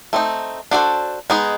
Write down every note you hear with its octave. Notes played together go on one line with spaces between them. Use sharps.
A3 C4 D#4
D4 F#4 A4 C5
G#3 B3 D#4 G#4